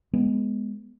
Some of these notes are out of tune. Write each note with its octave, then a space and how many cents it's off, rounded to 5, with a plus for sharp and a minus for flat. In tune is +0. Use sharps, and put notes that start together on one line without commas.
G#3 +0 B3 +0